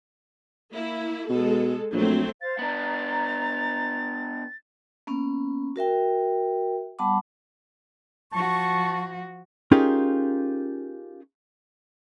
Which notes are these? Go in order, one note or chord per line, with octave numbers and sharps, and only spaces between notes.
A#3 E4
B2 G#3 A4
A#1 F#3 A3 C4
C5 F5 A6
B3 D4 A#5
A#3 B3 C#4
F#4 A#4 E5 G5
G3 B3 F#5 A5 B5 D6
F3 F#4 A5 C#6
C#4 D#4 F4 G4 G#4 A#4